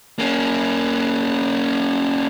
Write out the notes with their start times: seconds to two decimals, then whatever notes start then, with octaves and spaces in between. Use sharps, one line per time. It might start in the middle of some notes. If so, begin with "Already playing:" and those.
0.19 A#3 C#4